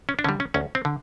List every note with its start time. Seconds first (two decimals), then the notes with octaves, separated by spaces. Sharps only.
0.09 C#4
0.19 D4
0.24 D3 G3 C#4
0.40 C#4
0.54 D2 C#4
0.75 C4
0.85 D3